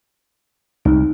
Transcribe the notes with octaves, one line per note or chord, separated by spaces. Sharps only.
C2 D#4